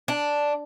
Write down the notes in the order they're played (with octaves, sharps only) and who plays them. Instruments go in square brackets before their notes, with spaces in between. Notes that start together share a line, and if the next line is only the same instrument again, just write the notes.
[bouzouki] D4